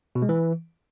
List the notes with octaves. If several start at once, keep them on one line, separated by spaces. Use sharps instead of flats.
B2
G#3
E3